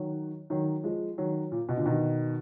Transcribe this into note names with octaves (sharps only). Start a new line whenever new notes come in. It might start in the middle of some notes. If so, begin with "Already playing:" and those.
Already playing: D#3 F#3
D#3 F#3
F3 G#3
D#3 F#3
A#2
B2
A#2 D3
B2 D#3